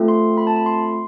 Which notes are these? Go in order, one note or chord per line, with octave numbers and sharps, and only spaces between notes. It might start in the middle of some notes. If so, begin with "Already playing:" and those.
Already playing: A3 C4 F4 A4
C6
B5
A5
B5
C6